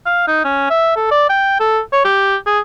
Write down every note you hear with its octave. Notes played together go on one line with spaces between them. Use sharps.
F5
D#4
C#4
E5
A4
D5
G5
A4
C#5
G4
G#4